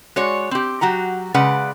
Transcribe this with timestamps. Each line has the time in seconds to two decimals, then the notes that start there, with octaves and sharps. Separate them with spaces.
0.16 G#3 F#4 C#5 D5
0.51 C4 G4
0.81 F#3 F#4 G4 A#5
1.34 C#3 G#3 B4 D5 F#5